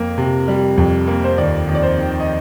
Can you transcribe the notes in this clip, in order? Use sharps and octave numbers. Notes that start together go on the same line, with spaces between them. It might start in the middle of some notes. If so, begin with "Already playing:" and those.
Already playing: F2 A#3
C3
G3
F2
A#3
C5
D#2 D5
D#2
D5
C5
D#3
D#5